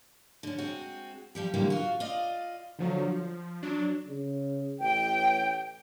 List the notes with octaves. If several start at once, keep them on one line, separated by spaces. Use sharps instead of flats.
D3 C#4
G#3 C4 F#4
F3 G3 G4
A2 D3 E3 G3 G#3 A#3
F4 F#4
F4 D5 D#5
D3 F3 F#3
F3
F#3 D4
C#3
A1 G5